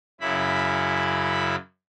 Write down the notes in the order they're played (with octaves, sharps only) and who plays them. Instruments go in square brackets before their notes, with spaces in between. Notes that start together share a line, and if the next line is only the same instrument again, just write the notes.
[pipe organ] F#2 C#3 E4 B5